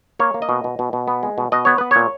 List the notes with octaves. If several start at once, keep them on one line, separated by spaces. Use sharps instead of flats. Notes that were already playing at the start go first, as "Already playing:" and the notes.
A#3 C#5
A#3
D#5
B2
B2
B2
B2
B3
G#3
B2
B2 D#5
B3 C#5
B3 B4
A#2 C#5